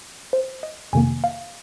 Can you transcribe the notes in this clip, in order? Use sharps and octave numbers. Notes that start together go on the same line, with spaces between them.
C5
D#5
F2 C3 D#3 A#3 G#5
F5